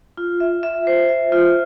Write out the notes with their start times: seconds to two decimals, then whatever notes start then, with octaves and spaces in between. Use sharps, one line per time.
0.17 F4
0.40 E5
0.63 E5
0.87 C5
1.09 E5
1.32 F4